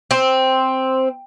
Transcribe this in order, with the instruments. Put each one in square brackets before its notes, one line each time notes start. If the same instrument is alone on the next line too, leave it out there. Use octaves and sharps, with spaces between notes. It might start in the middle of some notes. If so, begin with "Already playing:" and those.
[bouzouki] C4